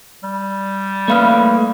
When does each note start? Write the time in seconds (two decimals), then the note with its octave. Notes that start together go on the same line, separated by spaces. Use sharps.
0.24 G3
1.08 A3 A#3 B4 F5 F6